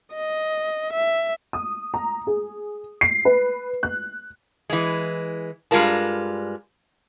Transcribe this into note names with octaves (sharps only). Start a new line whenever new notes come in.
D#5
E5
D#6
A#5
G#4
C7
B4
F#6
E3 G#3
G2 G3 G#3 F4 A#4 A5